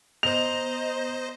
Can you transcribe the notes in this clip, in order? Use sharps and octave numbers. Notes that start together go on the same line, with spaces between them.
B3 C5 D#5 A#5 F7